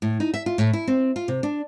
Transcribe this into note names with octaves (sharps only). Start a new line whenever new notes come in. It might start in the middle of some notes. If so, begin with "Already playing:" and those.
A2
D#4
E5
F4
A2
E4
C4
F4
C3
D4